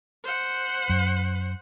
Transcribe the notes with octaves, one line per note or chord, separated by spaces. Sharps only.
C5 F#5
F#2